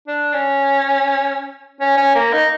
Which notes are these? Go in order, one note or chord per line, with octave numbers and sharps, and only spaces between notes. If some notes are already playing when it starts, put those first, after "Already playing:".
D4
C#4
C#4
C#4
A#3
D#4